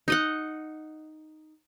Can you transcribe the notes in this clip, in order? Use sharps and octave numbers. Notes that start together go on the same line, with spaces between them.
D#4 D#5 F#5